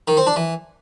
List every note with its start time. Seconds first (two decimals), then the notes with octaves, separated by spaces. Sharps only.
0.08 D#3
0.17 C4
0.27 D4
0.36 E3